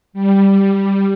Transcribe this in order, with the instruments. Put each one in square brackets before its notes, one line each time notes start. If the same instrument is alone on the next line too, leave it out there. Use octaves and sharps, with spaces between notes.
[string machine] G3